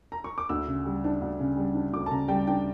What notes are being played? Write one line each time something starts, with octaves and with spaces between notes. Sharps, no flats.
A#5
C#6
D6
D2 E6
C#3
G3
D4
D2
C#3
G3
D4
D2 D6
A5
C#3 A#5
G3 G5
D4 G5